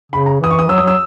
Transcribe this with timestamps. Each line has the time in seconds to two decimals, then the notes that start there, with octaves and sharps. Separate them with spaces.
0.12 C#3 B5
0.26 A#5
0.41 E3 D#6
0.51 C#6
0.59 D#6
0.69 F#3 E6
0.78 D#6
0.82 F#3
0.87 E6